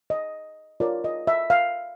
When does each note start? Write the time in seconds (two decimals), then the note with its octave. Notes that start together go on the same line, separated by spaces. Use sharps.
0.10 D#5
0.80 F4 A#4 C#5 D5
1.04 D#5
1.27 E5
1.50 F5